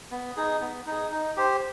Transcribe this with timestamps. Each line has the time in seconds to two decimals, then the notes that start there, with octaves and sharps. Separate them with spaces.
0.11 B3
0.36 D#4 G#4
0.61 B3
0.87 D#4 G#4
1.11 D#4
1.37 G4 C5